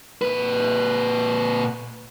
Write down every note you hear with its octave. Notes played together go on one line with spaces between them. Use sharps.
A#2 B4